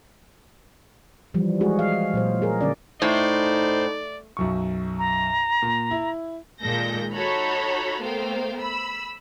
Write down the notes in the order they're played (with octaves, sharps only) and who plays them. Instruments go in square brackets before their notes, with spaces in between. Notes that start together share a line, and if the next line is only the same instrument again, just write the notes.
[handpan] E3 F3 G3
G#3 F#4 G#4
F5
A#2 F#3 C5
G#4 A#4
D3 C#4 D5
[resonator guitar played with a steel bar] A2 [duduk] D#4 [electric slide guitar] C5 [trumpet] D5
[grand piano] B1 F#2 C#6
[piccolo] A#5
[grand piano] A#2
E4
[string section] A#2 D#3 G#3 A4 G6 A#6
D#4 F#4 A4 C#5 A#5 B5
A3 B3 A#4 C5 F5 G5
B5 E6